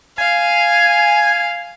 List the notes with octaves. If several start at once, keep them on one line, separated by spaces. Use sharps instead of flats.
F5 G#5